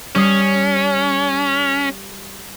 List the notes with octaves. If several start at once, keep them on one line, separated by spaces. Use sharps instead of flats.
G3 C#4 D#6 C7